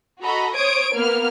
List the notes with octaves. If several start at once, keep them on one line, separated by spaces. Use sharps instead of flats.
F#4 A4 D#5 A#5 B5
C5 C#5 D#6 G#6 D7
A#3 B3 F6